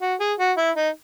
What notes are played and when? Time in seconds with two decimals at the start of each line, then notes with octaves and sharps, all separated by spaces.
0.02 F#4
0.20 G#4
0.39 F#4
0.57 E4
0.76 D#4